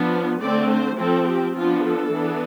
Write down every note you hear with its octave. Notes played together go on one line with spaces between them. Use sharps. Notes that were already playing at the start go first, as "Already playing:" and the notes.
Already playing: F3 B3 D4
D3 A3 C4 D5
C5
F3 C4 A4
G4
F3 B3 D4 F4
A4
E3 B3 D4